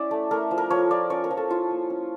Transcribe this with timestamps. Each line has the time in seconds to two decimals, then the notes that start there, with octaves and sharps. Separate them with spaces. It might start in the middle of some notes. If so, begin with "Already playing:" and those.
Already playing: C#4 E4 D5 E5
0.11 A3
0.31 A3 A#4
0.51 F3
0.58 A#4
0.70 F3 C#5
0.91 F3 D5
1.10 C#4 C#5
1.24 A#4
1.31 F3
1.37 A4
1.50 E4 F4
1.71 A#3
1.90 C#4